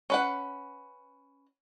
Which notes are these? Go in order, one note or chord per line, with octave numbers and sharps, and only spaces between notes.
C#4 B4 F#5